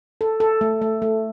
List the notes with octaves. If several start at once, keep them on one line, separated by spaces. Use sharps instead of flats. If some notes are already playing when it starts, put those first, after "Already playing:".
A4
A4
A3
A3
A3